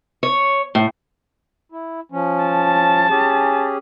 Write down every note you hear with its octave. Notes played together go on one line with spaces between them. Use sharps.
C#5
A2
E4
F3 C#4
A5
C#4 G4 G#4